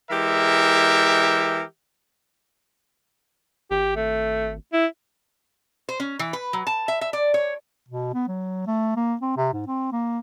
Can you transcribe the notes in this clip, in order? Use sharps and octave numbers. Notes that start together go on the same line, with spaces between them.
E3 G#3 G4 A#4 E5
G#1 G4
A3
E4
C5
C#4
E3
B4
F#3
A5
E5
E5
D5
C#5
B2
B3
F#3
A3
A#3
C4
C3
G#2
C4
A#3